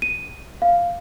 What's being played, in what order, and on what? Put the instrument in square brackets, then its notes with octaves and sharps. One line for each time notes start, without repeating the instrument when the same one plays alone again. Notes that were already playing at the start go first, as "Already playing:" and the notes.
[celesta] D#7
F5